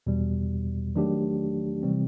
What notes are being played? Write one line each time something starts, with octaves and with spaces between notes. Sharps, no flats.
E2 B2 G3
D#3 F#3 A3 D4 G4
C3 E3 G3 C4